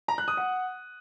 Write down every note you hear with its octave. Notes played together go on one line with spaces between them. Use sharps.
A#5
F#6
D#6
F#5